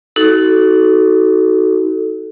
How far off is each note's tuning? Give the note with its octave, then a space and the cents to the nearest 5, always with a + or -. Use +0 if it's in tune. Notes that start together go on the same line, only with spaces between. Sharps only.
D#4 +40 F#4 +25 A4 +0